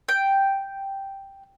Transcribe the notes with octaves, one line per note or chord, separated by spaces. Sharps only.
G5